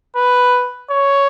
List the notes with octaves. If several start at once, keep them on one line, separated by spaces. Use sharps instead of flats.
B4
C#5